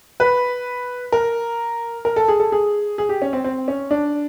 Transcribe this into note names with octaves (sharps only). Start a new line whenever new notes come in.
B4
A#4
A#4
A4
G#4
A4
G#4
G#4
G4
C#4
C4
C4
C#4
D4